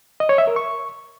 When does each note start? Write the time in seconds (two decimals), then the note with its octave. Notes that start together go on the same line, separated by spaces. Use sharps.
0.20 D#5
0.29 C#5
0.38 E5
0.47 A#4
0.56 C#6